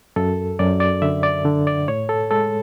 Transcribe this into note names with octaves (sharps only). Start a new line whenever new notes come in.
F#2 A4
F#2 D5
D5
D3 E5
D5
D3
D5
A2 C#5
A4
G#3 A4